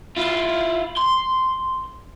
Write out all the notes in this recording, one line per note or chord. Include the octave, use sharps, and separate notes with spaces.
E4 F4
C6